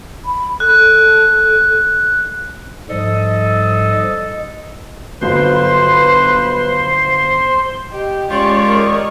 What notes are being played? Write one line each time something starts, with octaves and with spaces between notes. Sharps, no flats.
B5
A4 F#6
G#2 F3 G3 A4 D#5
G1 F#3 B4 C5 C6
G4 D#5
G#3 C#4 F4 G4 C#5 D5
A#4 D#5